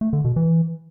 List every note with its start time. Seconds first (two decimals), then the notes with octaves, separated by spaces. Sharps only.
0.01 A3
0.13 D3
0.25 B2
0.36 E3